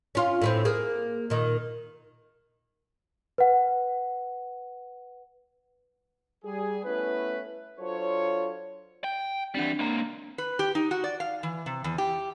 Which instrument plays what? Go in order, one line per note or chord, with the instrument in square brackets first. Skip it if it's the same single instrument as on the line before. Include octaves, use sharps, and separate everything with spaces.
[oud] C#4 F4
A2 B3 C4
A#3 G#4
A#2 D#3
[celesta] B4 F#5
[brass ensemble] G3 G#4
A3 B3 C#4 E4 B4
F#3 D4 F4 A4 C5 C#5
[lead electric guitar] G5
[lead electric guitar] E3 G3 [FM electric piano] C4 D4 F#5
[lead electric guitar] C#2 A#3
[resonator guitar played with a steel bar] B4
G4
D#4
F#4
D5
F5
E3
C3
E2
G4